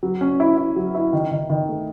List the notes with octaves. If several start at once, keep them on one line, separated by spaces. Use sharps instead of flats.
F#3
C#4
E4
E4
F#3
E4
D#3
D#3
D#3
A3